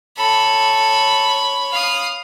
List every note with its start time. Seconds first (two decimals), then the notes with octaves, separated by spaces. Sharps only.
0.18 A4 C#5 B5
1.72 F5 D#6